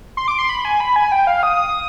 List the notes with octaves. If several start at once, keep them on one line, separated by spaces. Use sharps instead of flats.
C6
D6
C6
B5
G#5
B5
G#5
G5
F5
D#6